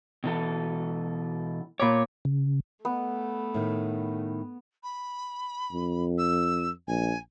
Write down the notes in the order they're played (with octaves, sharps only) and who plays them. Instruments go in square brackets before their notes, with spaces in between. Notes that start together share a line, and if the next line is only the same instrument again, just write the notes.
[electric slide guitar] B2 E3 A4
[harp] A#2 B5 D6 [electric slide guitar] C#5
[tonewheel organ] C#3
[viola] A3 [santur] B3
[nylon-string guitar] A2 D#3
[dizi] B5
[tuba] F2
[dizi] E6
[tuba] A#1 [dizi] G#5